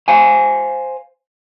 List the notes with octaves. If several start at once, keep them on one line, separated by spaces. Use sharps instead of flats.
C5 F5 G#5